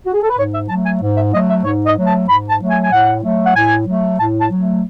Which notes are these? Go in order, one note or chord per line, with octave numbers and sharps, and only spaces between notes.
F#4
G#4
A4
B4
G#2 C#5
E5
F#3 A3 A5
G#5
G#2
E5
F#3 A3 D#5
E5
G#2 C#5
D#5
F#3 A3
A5
G#2 B5
A5
F#3 A3
G#5
G#5
A2 F#5
F#3 A3
F#5
A2 G#5
F#3 A3
A2 A5
A5
F#3 A3